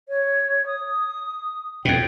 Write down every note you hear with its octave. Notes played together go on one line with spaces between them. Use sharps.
C#5
D#6
F2 B2 G5